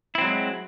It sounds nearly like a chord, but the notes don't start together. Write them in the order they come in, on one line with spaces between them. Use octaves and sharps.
E4 C4 F#3 G#3